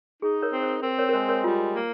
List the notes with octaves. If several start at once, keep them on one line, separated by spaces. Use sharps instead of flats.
D#4 G#4
A#4 C#5
C4
C5
C4 A#4
A#4 C#5
A#4
G#3 C5
A#4 C#5
G3 F4
A#3